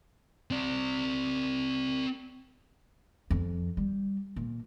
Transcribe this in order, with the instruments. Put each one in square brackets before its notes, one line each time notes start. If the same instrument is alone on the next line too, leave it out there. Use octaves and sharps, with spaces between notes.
[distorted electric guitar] C4 D5
[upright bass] F2
G3
A#2